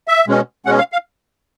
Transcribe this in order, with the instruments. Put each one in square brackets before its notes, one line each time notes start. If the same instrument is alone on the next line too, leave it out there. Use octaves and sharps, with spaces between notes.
[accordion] E5
B2 G#3 C#4
B2 G#3 C#4 F#5
F5
F5